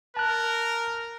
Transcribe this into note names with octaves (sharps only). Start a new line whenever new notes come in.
A#4 A5 F#6